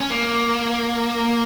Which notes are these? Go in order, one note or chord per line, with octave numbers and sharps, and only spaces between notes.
C#4
A#3